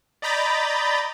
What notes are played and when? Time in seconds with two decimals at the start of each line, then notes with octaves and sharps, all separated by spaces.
0.22 D5 D#5 A#5 B5 G6 A6